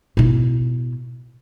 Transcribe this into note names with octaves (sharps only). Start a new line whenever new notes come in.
B2 E4